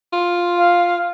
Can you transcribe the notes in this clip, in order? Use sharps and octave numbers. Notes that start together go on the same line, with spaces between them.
F4
F5